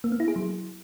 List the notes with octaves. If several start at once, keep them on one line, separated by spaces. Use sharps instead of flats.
A#3
B3
E4
G#4
F#3